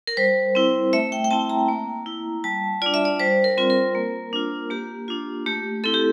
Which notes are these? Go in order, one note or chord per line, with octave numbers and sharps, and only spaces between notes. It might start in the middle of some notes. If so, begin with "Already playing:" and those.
A#4
G3 C5
C4 E4
A3 E5
G5
G5
C4 E4 A5
A#5
A#3
E4
G3 A5
D4 F4 D5
E5
D5
G3 C5
A#4
C4 F4
A#4
A#3
D4 F4
A#3 G4
D4 F4
A3 G4
C4 E4 A4
G4